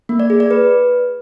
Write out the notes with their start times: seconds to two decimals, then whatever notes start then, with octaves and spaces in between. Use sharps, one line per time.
0.09 A#3
0.20 D5
0.30 G#4
0.40 D5
0.51 B4